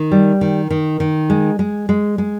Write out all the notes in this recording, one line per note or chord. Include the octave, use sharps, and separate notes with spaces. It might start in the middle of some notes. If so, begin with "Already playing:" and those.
Already playing: D#3
G3
D#3
D#3
D#3
G#3
G#3
G#3
G#3